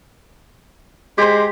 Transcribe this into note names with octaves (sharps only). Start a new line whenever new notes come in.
G#3 G4 C5